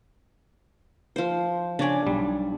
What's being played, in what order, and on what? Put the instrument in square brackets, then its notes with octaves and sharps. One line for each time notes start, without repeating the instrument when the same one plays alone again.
[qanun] F3 C5
[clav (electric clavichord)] C#3 C#5 G#5 [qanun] D4 D5
[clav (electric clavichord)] B1 G3